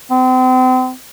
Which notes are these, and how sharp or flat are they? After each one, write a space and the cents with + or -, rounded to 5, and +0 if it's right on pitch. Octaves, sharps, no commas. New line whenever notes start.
C4 -35